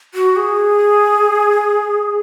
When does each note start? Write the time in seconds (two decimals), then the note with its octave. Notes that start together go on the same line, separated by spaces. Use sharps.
0.14 F#4
0.36 G#4